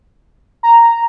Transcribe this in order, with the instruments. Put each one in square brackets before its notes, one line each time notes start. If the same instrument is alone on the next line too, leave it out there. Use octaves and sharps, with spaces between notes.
[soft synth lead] A#5